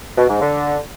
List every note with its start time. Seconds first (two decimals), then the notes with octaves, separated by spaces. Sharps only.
0.17 B2
0.29 G#2
0.41 D3